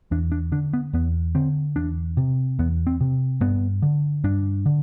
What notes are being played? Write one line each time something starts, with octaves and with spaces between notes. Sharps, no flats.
E2 D4
D4
D3 D4
B3
E2 B3
D3 C4
E2 D4
C3
E2 B3
C4
C3
G2 B3
D3
G2 D4
D3